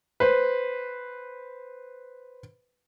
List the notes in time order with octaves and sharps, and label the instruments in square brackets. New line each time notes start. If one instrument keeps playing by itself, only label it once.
[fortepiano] B4 C5